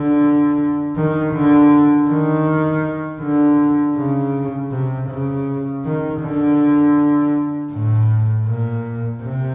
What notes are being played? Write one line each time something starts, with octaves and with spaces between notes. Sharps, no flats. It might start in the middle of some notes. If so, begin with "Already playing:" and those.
Already playing: D3
D#3
D3
D#3
D3
C#3
C3
C#3
D#3
D3
A2
A#2
C3